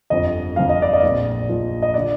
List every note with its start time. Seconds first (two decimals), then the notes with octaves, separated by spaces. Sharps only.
0.10 G1 F2 D3 F3 D#5
0.56 G1 F2 D3 F3 F5
0.69 D#5
0.82 D5
0.93 D#5
1.03 A#1 A#2 F3
1.49 A#1 A#2 F3
1.82 D#5
1.94 D3 D5